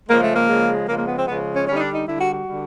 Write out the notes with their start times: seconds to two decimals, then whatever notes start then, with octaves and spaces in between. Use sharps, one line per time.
0.08 C#3 F3 G#3 A#3
0.23 A3
0.36 A#3
0.48 C#3 F3 G#3
0.88 C#3 F3 G#3 A#3
0.98 A#3
1.08 B3
1.18 C4
1.27 C#3 F3 G#3 B3
1.55 C#4
1.67 D3 G3 C#4
1.77 D#4
1.80 D4
1.94 D#4
2.07 D3 G3 E4
2.20 F#4
2.34 F#4
2.47 D3 G3